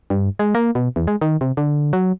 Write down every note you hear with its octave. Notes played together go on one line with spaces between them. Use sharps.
G2
G#3
A#3
B2
E2
G#3
D#3
C3
D3
F#3